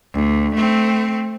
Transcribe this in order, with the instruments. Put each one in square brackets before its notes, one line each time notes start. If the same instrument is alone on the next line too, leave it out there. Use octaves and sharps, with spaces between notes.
[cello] D2
A3 C4